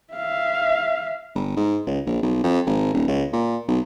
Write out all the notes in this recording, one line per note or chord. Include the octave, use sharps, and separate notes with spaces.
E5 F5
G1
G#2
C#2
A#1
B1
F2
G#1
D#1
C#2
A#2
B1